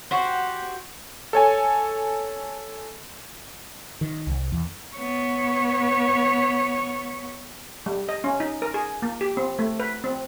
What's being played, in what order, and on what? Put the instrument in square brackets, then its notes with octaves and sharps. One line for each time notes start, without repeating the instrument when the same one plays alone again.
[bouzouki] F#4 G4 C5
[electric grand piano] A4 C#5 G#5
[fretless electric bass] D#3
C2
E2
[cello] B3 C#5
[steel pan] G3
D#5
C#4
D#4
A#4
G#4
A#3
G4
C4
A3
B4
C4